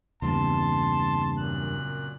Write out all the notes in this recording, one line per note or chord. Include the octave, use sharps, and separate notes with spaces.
E2 G2 C#3 A#3 C4 A5 C6
F#2 A#2 F#6